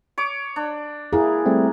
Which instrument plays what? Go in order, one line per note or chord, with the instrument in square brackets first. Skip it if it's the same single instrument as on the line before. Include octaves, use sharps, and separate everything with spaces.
[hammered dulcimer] C#5 D6
D4
[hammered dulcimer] A#3 [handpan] E4 G#4
[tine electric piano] G3 A3 C4